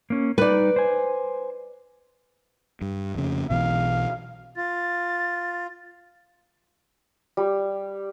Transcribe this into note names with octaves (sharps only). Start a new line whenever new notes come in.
A#3 C#4
G3 D#4 B4 D5
C5 G#5
G2
F2 C#3
B1 B2 E3 F5
F4 A6
G3